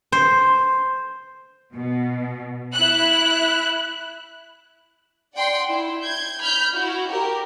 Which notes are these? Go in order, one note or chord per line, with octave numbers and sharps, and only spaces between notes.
C5
B2
E4 F#6
D5 F#5 G5 C6
E4
G6 G#6
B5 F6 G6
E4 F#4
G4 A#4